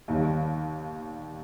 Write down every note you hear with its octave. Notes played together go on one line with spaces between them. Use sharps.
D#2 D#3 G3 A#3